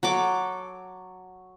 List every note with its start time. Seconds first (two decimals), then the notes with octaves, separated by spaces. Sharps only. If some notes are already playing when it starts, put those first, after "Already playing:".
0.03 F#3 A4 D6